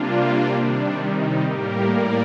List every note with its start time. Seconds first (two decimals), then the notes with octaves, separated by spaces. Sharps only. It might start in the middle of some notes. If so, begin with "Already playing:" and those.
Already playing: C3 G3 A#3 D4 F4
0.58 C3 D#3 G3 D4
1.02 D#4
1.46 A2 G3 A#3 G4 A#4
1.91 A#4 D5